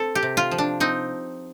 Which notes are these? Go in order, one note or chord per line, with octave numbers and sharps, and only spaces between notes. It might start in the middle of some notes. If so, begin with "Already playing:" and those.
Already playing: C4 A4
G4
C3
F4
F3
D4
C4 D#4